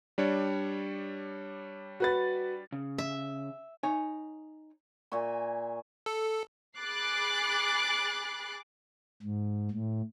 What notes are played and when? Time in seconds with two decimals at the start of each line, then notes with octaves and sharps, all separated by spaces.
0.18 G3 D4 C#5
2.00 F#4 B4 A6
2.72 C#3
2.98 E5
3.83 D#4 C#5 G#5
5.12 A#2 E5 G#5 C#6
6.06 A4
6.78 G#4 B5 D6 F#6 A6 C7
9.22 G#2
9.71 A2